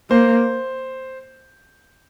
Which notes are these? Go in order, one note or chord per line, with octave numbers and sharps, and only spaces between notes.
A#3 C5